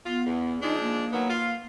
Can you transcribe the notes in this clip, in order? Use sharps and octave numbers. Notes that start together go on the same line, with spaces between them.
B3 F4
E2
F3 G#3 D4 D#4
A#3
D#3 F#3 B3
F4